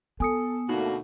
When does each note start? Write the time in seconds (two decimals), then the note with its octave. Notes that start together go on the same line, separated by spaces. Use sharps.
0.20 B3 A4 G#5 D#6 C#7
0.69 D2 B2 D3 A3 A#3 D#4 F#4